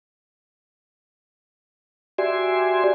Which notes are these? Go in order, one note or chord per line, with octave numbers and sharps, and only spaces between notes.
F#4 G4 D5 E5 G#5 C6